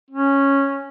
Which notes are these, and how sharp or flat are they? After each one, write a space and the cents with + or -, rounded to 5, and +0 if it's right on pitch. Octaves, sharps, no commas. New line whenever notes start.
C#4 -5